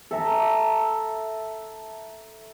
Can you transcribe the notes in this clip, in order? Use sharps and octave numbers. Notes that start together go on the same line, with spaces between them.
A4 E5 A#5